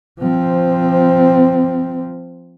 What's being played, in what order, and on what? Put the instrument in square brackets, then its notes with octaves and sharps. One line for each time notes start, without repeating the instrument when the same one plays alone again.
[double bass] F3 C4